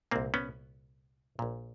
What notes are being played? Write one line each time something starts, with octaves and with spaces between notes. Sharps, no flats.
C2 A#2 A#3 C4
B3 C#4
A#1 A#2